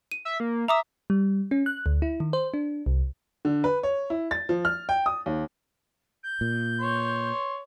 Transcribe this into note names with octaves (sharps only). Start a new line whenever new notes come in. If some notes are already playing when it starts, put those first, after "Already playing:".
D#7
E5
A#3
E5 A#5 D6 D#6
G3
C#4
F#6
D2
E4
D#3
C5
D4
C2
D3
B4
C#5
E4
A6
F3
F6
G5
D#6
D#2
G6
A#2
C#5 C6